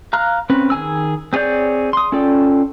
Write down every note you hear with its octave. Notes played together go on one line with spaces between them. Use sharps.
F5 A#5 F6 F#6
C4 C#4 B4
D#3 G#4 G#5 E6
C4 G#4 C#5 D5 G6
C6 D#6
C#4 F4 A4 D5 G5